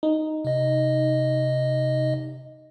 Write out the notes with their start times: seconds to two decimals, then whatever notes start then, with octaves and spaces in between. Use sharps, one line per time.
0.03 D#4
0.45 C3 D#5